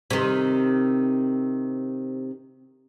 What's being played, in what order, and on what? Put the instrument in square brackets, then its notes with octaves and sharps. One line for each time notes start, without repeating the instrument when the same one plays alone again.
[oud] C3 D#3